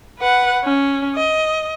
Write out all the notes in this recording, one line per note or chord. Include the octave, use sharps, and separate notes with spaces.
B4 F#5
C#4
D#5